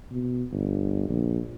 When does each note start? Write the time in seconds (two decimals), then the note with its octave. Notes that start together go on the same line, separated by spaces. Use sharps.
0.11 B2
0.52 G1
1.09 A#1